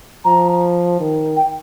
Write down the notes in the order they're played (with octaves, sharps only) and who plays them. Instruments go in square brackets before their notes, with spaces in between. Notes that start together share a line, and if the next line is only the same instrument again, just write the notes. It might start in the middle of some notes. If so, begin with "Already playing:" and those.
[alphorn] F3 [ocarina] A#5
[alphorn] D#3
[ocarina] G5